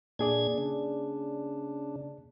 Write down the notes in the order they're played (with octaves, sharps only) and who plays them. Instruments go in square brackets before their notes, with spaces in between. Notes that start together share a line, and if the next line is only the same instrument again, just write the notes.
[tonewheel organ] A#2 D4 G#6 [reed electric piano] A#3 G#4 D5
[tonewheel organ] C#3 D4